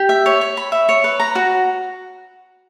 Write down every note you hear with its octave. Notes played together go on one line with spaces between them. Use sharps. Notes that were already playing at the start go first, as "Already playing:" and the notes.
Already playing: G4
E5
C#5
C#5
B5
E5
C#5
B4
A#5
F#4